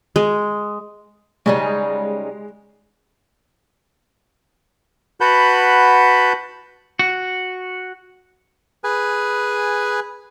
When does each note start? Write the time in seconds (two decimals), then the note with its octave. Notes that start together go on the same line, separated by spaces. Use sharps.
0.16 G#3
1.46 C#3 G3 G#3 D#4
5.21 F#4 B4 F#5 A5 B5 G6
6.99 F#4
8.84 G#4 B4 G#5